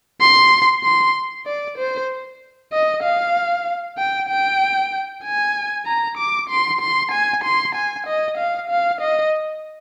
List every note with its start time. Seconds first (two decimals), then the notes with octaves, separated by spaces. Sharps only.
0.21 C6
0.84 C6
1.46 D5
1.78 C5
2.73 D#5
3.04 F5
3.98 G5
4.29 G5
5.24 G#5
5.86 A#5
6.18 D6
6.49 C6
6.81 C6
7.12 G#5
7.44 C6
7.75 G#5
8.07 D#5
8.37 F5
8.70 F5
9.01 D#5